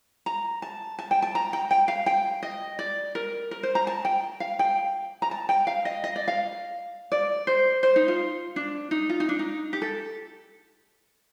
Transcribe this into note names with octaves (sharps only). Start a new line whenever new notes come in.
A#5
A5
A5
G5
A5
A#5
G5
G5
F5
G5
D#5
D5
A#4
A#4
C5
A#5
A5
G5
F5
G5
A#5
A5
G5
F5
D#5
D#5
D5
F5
D5
C5
C5
D#4
F4
D4
D#4
F4
D#4
D4
D#4
G4
A4